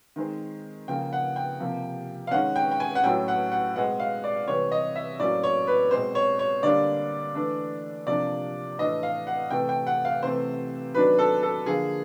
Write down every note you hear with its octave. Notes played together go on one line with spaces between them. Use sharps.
D#3 G#3 C4
C#3 F3 A#3 G5
F#5
G5
C3 F3 A#3
F5
D#3 G#3 C#4 F#5
G5
G5
G#5
F#5
A2 F#3 A3 C#4 G5
F#5
F#5
B2 G#3 C4 F#5
F5
D5
C3 E3 G3 C4 C#5
D#5
E5
A2 F#3 A#3 C#4 D5
C#5
B4
B2 G#3 C4 C5
C#5
C#5
D3 G3 A#3 D4 D5
E3 A3 D4
C3 F3 A#3 D4 D5
A2 E3 A3 D4 D#5
F5
F#5
C3 E3 A3 G5
G5
F#5
F5
C3 E3 A3 C4 C5
D#3 F#3 B3 D4 B4
A4
A4
D3 F3 A#3 G#4